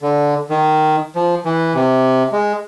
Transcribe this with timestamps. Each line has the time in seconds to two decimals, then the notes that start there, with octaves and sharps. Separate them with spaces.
0.02 D3
0.50 D#3
1.16 F3
1.45 E3
1.75 C3
2.32 G#3